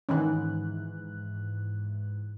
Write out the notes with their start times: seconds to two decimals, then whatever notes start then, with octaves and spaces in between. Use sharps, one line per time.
0.09 G#2 D#3 E3 C#4 F#6